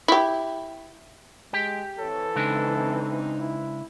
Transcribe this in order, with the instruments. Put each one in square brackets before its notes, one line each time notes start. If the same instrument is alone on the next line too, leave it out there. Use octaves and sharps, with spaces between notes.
[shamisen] E4 G4
[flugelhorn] G#3 [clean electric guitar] G4 G5
[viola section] E3 C4 [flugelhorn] A4 [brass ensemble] C#5
[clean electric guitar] C#3 G#3 D4 [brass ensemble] D#4
[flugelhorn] E4